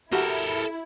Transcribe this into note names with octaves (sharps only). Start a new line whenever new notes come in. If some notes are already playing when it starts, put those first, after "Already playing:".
E4 F#4 G4 A4 A#4 F#5